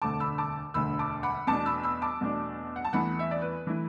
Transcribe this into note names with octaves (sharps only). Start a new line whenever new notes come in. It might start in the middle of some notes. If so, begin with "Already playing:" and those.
E1 D2 D3 A3 A5 D6
B5 E6
A5 D6
E1 D2 D3 A3 B5 E6
A5 D6
F#5 B5
E2 B2 A3 D4 A5 D6
B5 E6
B5 E6
A5 D6
E2 B2 A3 D4
F#5
A5
E2 E3 A3 E4 F#5 B5
E5
D5
B4
E3 A3 E4